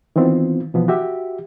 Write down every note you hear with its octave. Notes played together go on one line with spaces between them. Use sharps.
D#3 E3 B3 C4 F4
B2 E3 F3 B3
F#4 G4 E5